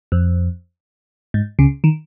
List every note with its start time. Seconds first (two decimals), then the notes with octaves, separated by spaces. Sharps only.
0.12 F2
1.34 G#2
1.59 C#2 C#3
1.84 D#3